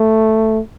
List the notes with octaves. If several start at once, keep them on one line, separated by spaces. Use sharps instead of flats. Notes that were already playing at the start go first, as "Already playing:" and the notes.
Already playing: A3